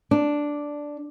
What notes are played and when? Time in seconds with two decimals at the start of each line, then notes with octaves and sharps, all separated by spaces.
0.11 D4